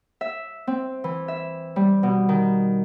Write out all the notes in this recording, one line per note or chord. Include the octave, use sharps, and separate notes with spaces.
E5
C4
E3
E5
G3
B2
D#3